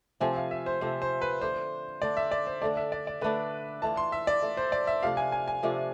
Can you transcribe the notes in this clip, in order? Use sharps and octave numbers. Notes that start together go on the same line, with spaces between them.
C3 F3 A3 C4 G#5
F5
E5
C5
C3 F3 A3 C4 C5
C5
B4
D3 A3 D4 C5
D3 A3 D4 D5
E5
D5
C5
D3 A3 D4 D5
E5
D5
D5
D3 A3 D4 B4
E3 A3 D4 F4 A5
C6
E5
D5
E3 A3 D4 F4
C5
D5
E5
C3 F3 A3 D4 F5
G#5
G#5
G#5
C3 F3 A3 D4